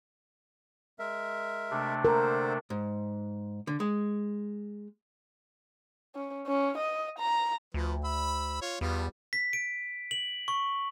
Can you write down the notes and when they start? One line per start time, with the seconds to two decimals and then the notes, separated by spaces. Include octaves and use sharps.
0.99 G#3 A#4 E5
1.71 C3 A3 D4
2.05 D3 A#4 C5
2.70 G#2
3.67 D3
3.80 G#3
6.15 C#4
6.47 C#4
6.78 D#5
7.19 A#5
7.74 D2 F3 B4
8.04 B5 E6
8.62 F4 C#5
8.81 E2 G3 B3 F4
9.33 B6
9.53 D7
10.11 F#7
10.48 C#6